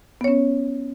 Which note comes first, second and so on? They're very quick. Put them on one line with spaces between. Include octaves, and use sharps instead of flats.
B3 C#5 C#4